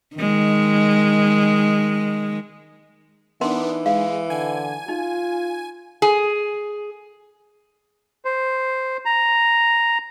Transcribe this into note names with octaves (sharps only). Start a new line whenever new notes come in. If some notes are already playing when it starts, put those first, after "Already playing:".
D#3 G#3
E3 B3 D4 D#4 A#4 F#5 C6
G#3 F5
D3 G#5
D#4 F4
G#4
C5
A#5